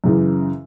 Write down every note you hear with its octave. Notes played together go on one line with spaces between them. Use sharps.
F#2 C#3 E3